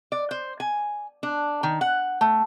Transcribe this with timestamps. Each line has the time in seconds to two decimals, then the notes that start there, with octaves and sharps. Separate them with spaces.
0.12 D5
0.31 C5
0.60 G#5
1.23 D4
1.63 D#3
1.81 F#5
2.21 A3